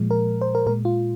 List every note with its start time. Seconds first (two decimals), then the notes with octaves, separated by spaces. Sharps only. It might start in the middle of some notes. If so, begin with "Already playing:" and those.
Already playing: A#2 F3 G#3
0.11 A#4
0.41 C5
0.55 A#4
0.66 A#2 G#3 A#4
0.85 F4